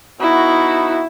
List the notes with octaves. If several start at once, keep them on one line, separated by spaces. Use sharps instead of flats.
B3 D#4 E4 F#4